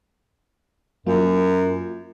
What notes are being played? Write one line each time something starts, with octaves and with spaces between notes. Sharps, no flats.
F#2 F#3 A#3 F4